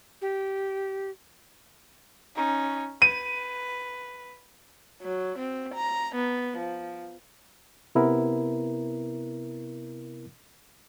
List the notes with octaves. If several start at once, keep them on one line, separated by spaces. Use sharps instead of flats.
G4
C#4 D#4
B4 D#7
F#3
C4
A#5
B3
F3
C3 B3 E4 A#4